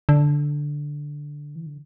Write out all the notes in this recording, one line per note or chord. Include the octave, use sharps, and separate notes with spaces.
D3
E3
D3